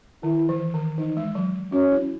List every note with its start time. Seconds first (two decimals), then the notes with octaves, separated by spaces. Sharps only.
0.23 D#3 E4
0.49 E3
0.74 D#3
0.98 E3 D#4
1.17 G#3
1.35 F#3
1.72 C#4 F#4
1.91 E4